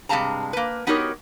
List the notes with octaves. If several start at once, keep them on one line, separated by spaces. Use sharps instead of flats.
G2 C3 G#3 F5 A5 A#5
A#3 B4
B3 D#4 F#4 G4 A#4 C#5